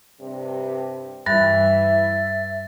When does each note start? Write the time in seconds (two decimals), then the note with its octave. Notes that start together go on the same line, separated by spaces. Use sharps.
0.20 G2 C3
1.26 G2 E3 G3 E5 F#6 A6